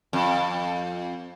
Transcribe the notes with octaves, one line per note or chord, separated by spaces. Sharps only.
F2